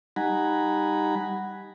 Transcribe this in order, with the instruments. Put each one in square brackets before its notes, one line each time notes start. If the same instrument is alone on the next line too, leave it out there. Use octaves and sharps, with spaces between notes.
[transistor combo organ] G3 D#4 F#5 G#5 A#5 B5